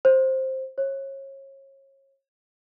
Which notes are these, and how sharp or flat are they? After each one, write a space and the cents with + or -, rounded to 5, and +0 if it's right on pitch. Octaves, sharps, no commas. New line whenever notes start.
C5 +10
C#5 -30